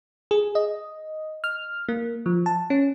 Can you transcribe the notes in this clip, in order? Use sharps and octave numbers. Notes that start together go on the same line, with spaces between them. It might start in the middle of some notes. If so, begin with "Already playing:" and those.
G#4
D#5
F6
A#3
F3
A5
C#4